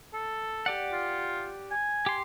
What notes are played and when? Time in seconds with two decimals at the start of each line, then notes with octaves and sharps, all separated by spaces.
0.13 A4
0.66 G4 D5 F#5
0.92 F4
1.71 G#5
2.06 G4 C6